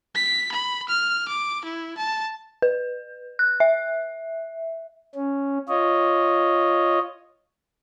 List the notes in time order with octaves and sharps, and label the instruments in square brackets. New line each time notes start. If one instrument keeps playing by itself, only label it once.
[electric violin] B6
B5
F6
D6
E4
A5
[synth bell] B4
F#6
E5
[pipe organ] C#4
F4 C#5 D#5